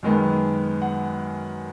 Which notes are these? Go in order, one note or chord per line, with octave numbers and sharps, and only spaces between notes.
F#2 D#3 G#3 B3
F#5